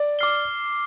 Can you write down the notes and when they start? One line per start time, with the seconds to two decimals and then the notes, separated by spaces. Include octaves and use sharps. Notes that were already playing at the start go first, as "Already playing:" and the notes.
Already playing: D5
0.19 D6 F6 C7 G7